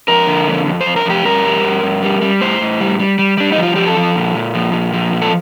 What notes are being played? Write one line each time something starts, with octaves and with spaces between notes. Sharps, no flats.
F2 A#4
D3
F2
F2
C5
F2
A#4
F2 G4
G2 A#4
G3
G2
G2
G3
G3
A2 C5
A2
G3
G3
G3
G3 D4
D#4
F3
F4
F3 G4
A4
F3
A#2
A#2
F3
A#2
F3
A#2
A4